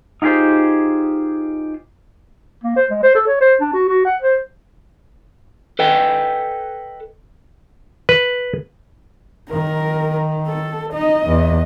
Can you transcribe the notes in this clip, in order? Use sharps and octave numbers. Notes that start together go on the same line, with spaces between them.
D#4 F4 G4 G#4 C5
A#3
C5
G#3
C5
A4
C#5
C5
D4
F#4
F#4
F#5
C5
A4 B4 D#5 G5
B4
D#3 A#4
A4
D#4 D#5
E2